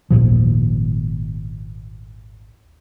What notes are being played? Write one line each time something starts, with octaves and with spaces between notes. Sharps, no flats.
G#1 D#2 A#2 F3